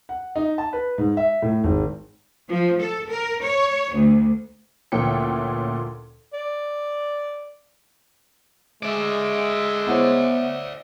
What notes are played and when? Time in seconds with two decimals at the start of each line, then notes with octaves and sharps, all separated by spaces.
0.09 F#5
0.36 D#4
0.58 A5
0.73 B4
0.98 G#2
1.17 E5
1.42 A2
1.64 G#1
2.48 F3
2.79 A4
3.09 A#4
3.41 C#5
3.93 D2
4.92 D2 A#2 E3 C#4 G5 C#7
6.33 D5
8.83 G#3 D5 E5
9.87 B3 E4 C5 C#5